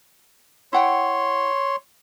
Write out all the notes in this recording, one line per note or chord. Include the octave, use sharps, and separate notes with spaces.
E4 C#5 F#5 G5 C6